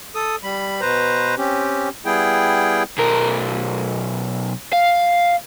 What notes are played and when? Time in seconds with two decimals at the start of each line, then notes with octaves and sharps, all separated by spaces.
0.15 A4 D#6
0.43 G3 B5
0.81 B2 B4 C5 A#5
1.38 C4 C#4 G4
2.06 G3 B3 E4 G#4 G5
2.98 B1 A#4
4.73 F5